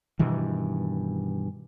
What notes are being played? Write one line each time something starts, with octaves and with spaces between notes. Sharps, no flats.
G2 B2 D#3 E3